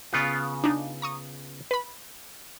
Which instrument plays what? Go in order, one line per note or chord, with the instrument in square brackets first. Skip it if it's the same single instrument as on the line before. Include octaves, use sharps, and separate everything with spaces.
[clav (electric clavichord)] C#3 B3 F4
[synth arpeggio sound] D4 D#4
A#5 C#6 D#6
B4 B5